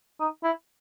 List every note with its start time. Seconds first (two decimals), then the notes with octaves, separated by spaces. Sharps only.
0.20 D#4
0.43 E4